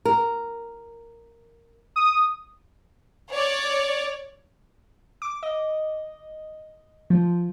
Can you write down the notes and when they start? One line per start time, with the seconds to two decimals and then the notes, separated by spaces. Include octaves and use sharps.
0.05 A#4
1.96 D#6
3.33 C#5 D5
5.22 D6
5.43 D#5
7.10 F3